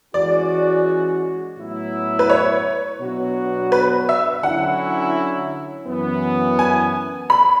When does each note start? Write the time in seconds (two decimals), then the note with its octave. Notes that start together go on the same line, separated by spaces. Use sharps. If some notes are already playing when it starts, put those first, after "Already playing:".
0.14 E3 G#3 C#4 F#4 D5
1.58 A2 F#3 B3 E4
2.19 B4
2.29 C#5
3.01 B2 F#3 B3 D4 F#4
3.72 B4
4.09 E5
4.43 D3 F#3 C#4 E4 F#5
5.87 F#2 E3 B3
6.59 G#5
7.30 B5